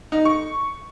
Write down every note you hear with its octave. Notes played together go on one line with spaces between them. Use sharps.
D#4
C#6